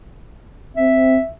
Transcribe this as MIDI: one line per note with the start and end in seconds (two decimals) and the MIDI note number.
0.77 1.18 60
0.77 1.31 76